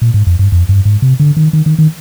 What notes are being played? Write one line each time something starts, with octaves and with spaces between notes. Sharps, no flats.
A#2
G#2
F2
G2
F2
G2
G#2
C3
D3
D#3
D#3
D#3
D#3